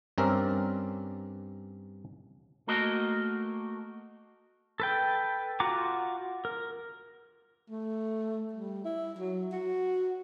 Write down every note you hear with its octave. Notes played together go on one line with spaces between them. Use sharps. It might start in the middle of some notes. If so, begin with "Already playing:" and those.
G2 C4 C#4 A#4 D5 E5
A3 A#3 F#4 A4 A#4 D#5
A4 B4 G5
F4 F#4 F#5 A#5 D6
A#4
A3
G3
E4
F#3
F#4